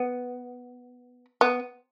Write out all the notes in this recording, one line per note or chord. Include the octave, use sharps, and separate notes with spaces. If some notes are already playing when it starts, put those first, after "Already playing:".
Already playing: B3
B3